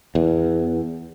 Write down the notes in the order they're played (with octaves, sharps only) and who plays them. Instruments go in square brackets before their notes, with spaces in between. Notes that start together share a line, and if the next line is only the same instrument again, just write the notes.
[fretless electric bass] E2